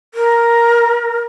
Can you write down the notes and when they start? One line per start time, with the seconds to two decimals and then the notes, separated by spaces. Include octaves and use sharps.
0.14 A#4